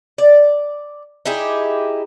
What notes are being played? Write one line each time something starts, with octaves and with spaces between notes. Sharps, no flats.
D5
D#4 E4 G4 G#4